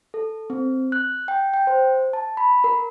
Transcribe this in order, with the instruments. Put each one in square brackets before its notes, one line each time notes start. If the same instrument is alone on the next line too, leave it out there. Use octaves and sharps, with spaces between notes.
[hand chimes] A4
C4
F#6
G5
G5
C5
A5
B5
A#4